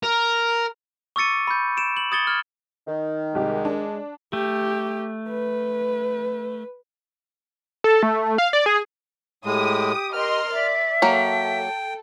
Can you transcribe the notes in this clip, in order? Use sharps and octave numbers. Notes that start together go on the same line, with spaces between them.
A#4
C#6 D6 E6 A6 C#7 D#7
B5 G6
D7 E7
F#7
D#6 G#6 A6 C#7 G7
F6 G#6
D#3
C2 G#3 G4
D4
A3 G4
B4
A4
A3
F5
D5
G#4
A2 G#3 G4 D#6
A#4 D#5 C6 F6
D5 E5
F#3 A#3 A4 G5